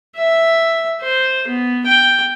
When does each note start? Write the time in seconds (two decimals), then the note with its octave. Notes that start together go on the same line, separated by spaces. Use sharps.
0.17 E5
1.01 C5
1.48 B3
1.86 G5